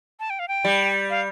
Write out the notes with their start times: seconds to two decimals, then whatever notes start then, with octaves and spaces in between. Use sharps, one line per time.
0.20 A5
0.30 G5
0.39 F5
0.48 G5
0.65 G3
1.10 F5